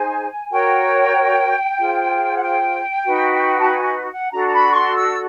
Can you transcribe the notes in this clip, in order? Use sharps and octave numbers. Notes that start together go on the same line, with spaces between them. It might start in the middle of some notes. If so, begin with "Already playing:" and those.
Already playing: D#4 G#4 C5 G#5
F#4 A#4 C#5 G5
F4 G#4 C5
F#5
G5
D#4 F#4 B4
A5
G#5
F#5
D4 F#4 A4 A#5
A#5
B5
C#6
C6
E6